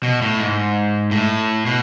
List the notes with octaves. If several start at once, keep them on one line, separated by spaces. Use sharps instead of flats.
B2
A2
G#2
A2
B2